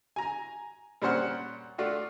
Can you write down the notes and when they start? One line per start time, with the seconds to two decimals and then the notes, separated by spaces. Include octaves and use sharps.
0.16 G#5 A#5
1.02 A#2 G3 C#4 C5 F#5 F6
1.78 A3 D4 F4 F#4